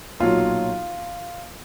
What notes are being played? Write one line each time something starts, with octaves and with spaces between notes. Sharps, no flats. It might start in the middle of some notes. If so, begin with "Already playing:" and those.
B1 A#2 F#3 F4